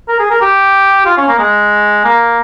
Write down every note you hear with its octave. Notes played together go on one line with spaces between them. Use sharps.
A#4
G#4
A#4
G4
F4
C#4
A#3
G#3
A#3